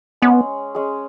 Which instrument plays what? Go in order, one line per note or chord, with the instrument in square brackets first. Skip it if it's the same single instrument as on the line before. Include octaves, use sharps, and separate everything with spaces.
[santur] G#3 C#4 G#4 [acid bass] B3
[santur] G#3 C#4 G#4